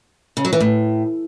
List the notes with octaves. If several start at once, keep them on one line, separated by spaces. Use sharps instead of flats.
C#3
F#3
E3
A2